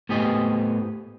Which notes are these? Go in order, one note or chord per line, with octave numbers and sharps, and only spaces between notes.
A2 B3 G4 G#4 C5 D#5